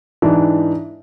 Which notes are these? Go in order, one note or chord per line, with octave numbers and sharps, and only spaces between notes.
G#2 E3 D4